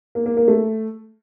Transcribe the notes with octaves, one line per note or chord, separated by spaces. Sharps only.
A#3
A#3
A#3
A3